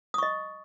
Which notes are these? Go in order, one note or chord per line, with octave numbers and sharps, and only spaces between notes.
D#5 C#6 D#6